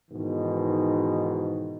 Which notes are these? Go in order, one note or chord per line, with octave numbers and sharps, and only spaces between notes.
G#2 B2 D#3 E3